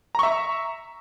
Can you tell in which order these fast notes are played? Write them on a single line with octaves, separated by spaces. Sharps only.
A#5 C#6 E5